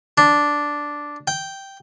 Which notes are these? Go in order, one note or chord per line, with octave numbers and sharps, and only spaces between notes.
D4
G5